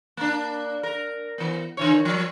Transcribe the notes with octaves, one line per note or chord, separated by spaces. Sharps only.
A#3 D4
A#4
E3 B3
D3 E3 C#5
F3 G3